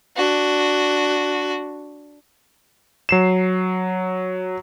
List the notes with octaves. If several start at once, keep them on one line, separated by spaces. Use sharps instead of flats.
D4 F#4
F#3 C7 E7